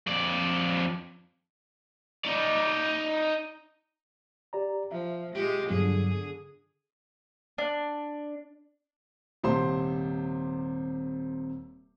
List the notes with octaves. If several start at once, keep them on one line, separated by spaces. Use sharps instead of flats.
F2 D5
D#4 D5
G4 D5 A#5
F3 E5
G#3 F4 G4
G2 D3 F#3 B3 G#4
D4
D#1 C3 G4 C5 C6